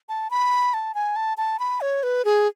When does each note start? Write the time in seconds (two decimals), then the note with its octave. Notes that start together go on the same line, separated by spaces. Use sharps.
0.09 A5
0.30 B5
0.74 A5
0.95 G#5
1.16 A5
1.37 A5
1.59 B5
1.81 C#5
2.03 B4
2.25 G#4